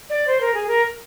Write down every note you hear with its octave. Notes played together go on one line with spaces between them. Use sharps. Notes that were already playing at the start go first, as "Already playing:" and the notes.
D5
C5
A#4
G#4
A#4